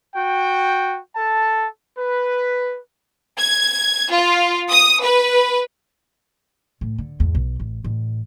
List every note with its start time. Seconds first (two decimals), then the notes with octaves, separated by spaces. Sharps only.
0.15 F#4 G5
1.15 A4 A5
1.98 B4
3.39 G#6
4.12 F4
4.70 D#6
5.03 B4
6.81 A2
6.98 D3
7.20 E2 G#2
7.35 B1
7.60 A1
7.84 A1